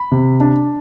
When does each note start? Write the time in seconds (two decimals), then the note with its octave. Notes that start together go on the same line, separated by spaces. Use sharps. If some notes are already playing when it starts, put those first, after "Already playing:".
Already playing: B5
0.12 C3
0.40 D4